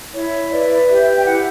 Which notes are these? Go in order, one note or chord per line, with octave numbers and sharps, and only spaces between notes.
E4 C#5
B4 D5
G4 E5
G5
E4 F#5